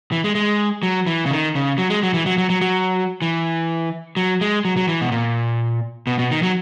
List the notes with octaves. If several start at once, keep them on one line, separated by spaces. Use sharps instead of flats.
E3
G#3
G#3
F#3
E3
C#3
D#3
C#3
F#3
G#3
F#3
E3
F#3
F#3
F#3
F#3
E3
F#3
G#3
F#3
F#3
E3
B2
A#2
B2
B2
D#3
F#3